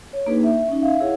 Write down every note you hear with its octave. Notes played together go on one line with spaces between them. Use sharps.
C#5
A#3 D4 D#4 G#4 B4
E5
C#4 D#4
E5 F5
E4 G#4 C#5 F5 F#5